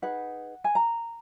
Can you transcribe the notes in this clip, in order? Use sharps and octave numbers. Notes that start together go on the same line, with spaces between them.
D#4 G#4 B4 F#5
G#5
A#5